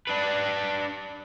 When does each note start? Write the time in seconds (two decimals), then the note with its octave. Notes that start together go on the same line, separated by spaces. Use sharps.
0.07 D4 B4